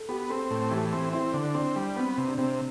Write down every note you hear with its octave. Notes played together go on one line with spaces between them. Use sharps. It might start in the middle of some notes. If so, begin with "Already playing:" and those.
Already playing: A4
B3 G4
C4 A4
A2
E3 G4
C4
C4 E4
D3
C4 D4
G3
B3 C4
C3
D4
C3 C4